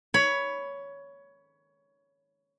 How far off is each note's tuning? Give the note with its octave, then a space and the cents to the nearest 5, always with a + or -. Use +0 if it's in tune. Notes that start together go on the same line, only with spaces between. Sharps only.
C#5 +15 B5 +0